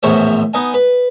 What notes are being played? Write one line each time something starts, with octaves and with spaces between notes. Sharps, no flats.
A#1 E2 A2 E4 C5 C#5
B3 D#4 G#5
B4